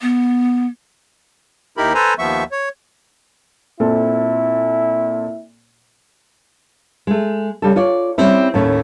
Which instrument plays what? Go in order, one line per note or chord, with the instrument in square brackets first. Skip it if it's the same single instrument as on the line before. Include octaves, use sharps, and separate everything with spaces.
[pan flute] B3
[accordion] D#2 D#4 E4 G4 A#4 B5
A4 B4 C5 G#5 A#5
D#2 F3 B3 E5 C#6
C#5
[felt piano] A#2 C4 A4 [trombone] E4
[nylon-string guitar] G#3 A3
C#3 G3 A4
F4 C#5 D5
G3 C4 C#4 E4
D#2 A2 A3 C#4